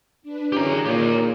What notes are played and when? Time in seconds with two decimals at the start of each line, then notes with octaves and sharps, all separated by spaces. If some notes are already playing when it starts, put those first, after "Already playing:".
0.22 D4 B4
0.53 F#2 E3 C#4 G4 G#4 C#5 A#5
0.85 A#2 D#4 G4